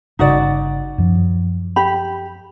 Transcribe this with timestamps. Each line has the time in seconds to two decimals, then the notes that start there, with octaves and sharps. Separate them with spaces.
0.19 G1 C#3 D#4 F#4 D5
0.98 F#2 F3
1.76 G4 B5